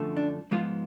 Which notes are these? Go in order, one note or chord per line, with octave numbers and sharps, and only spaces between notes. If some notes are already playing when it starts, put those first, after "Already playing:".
Already playing: F#2 D3 F3 A3
D4
G#2 F3 G#3 B3 F4